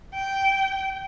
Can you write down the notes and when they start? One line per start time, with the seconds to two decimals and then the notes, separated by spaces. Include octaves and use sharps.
0.14 G5